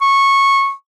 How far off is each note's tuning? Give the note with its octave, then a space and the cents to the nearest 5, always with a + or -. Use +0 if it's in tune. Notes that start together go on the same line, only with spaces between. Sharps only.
C#6 -15